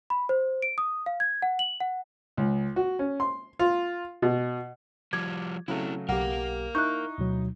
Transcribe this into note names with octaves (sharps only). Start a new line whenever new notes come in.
B5
C5
D7
D#6
F5
G#6
F#5
F#7
F#5
C#2
F#4
C#4
C6
F4
B2
F3 G3 D6 G#6
C#3 F#3 A3 C4 E4
B1 G4 A#4 F5 F#5
D#4 E4 C#6 F#6 G6
D2 B2 F#3